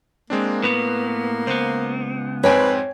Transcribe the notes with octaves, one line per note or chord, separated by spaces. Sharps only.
G#3 A#3 C4 D4
A2 B3 B4
C#2 B3 C5
F2 G#2 C4 B4 C#5 G5 G#5